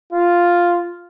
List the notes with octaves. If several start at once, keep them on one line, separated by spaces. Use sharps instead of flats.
F4